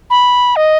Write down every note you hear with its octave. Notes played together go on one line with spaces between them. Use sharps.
B5
D#5